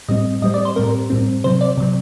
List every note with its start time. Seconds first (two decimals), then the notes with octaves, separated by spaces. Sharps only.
0.09 A2 G3 C4 D#5
0.42 A2 G3 C4 D#5
0.54 D5
0.65 C5
0.76 A2 G3 C4 A#4
1.10 A2 G3 C4
1.44 C3 F#3 C4 C5
1.61 D5
1.77 C3 F#3 C4